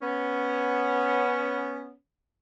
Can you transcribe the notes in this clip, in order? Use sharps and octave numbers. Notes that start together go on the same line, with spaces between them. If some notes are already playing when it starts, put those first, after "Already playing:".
B3 C#4